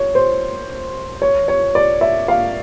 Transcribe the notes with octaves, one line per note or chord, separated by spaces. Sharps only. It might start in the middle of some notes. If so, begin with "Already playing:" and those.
Already playing: C#5
C5
C#5
C#5
D5
E5
F5